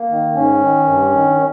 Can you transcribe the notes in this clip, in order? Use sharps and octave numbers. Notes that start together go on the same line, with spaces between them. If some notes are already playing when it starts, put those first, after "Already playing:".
Already playing: A#3
D#3
G#2 C#4
D#3
G2
D#3